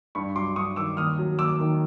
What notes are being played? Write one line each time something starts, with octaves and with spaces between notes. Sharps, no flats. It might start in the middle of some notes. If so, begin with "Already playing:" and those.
G2 B5 C#6
F#3 C6 D6
G2 C#6 D#6
D#3 D6 E6
D#2 D#6 F6
F#3
D#2 D6 E6
D#3